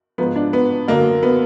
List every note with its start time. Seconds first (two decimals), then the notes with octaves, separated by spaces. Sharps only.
0.18 G#2 F3 B3
0.36 D4
0.53 B3
0.88 F#2 D3 F#3 A#3
1.23 B3